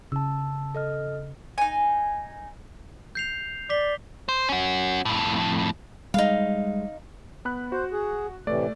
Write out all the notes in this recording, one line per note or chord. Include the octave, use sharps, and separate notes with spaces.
C#3 A5 E6
A4 D#5 F6
D#4 G#5
G6 C7 F7
D5 D6 B6 G7
C5
C#4 F#4
F2 A2
G3 G#3 D#4 F5
B3 B5 F#6
F#4 C5
G#4
A2 C3 E3 A3 D5